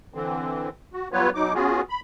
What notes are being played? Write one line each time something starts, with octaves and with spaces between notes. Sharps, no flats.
D3 E3 C4
F#4
F#3 G3 B3 F4 B4 C#5
B2 F#3 D#4 D6
B3 C#4 F4 F#4 G#4
B5